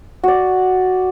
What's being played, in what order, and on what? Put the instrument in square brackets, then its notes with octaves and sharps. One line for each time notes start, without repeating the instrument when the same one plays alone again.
[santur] F#4 D5